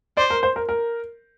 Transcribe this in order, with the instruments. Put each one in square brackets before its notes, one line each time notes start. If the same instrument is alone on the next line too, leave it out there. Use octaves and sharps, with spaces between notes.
[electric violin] C5 [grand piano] D5
[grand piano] A#4
C5
A#4
A#4